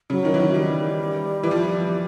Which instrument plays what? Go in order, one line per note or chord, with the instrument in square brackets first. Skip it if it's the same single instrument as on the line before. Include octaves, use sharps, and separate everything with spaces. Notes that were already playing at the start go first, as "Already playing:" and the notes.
[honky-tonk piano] C#3 [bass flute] F#3
[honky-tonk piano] D#3
E3
D#3
[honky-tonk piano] D#3 [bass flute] G3
[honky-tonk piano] E3
F3